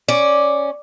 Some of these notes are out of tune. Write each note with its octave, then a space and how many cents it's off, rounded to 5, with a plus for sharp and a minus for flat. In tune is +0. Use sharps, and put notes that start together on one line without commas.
C#4 +0 D5 +0